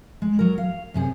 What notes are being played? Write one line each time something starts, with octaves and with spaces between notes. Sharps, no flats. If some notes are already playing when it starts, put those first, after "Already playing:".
G#3
F#3 A#4
F5
F#2 C3 G#4